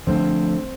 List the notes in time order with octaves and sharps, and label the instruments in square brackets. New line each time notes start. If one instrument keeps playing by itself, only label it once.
[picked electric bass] D3 F3 A3 D4 [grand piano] C4